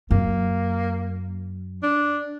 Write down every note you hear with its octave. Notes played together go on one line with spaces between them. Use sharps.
F#2 A#3
D4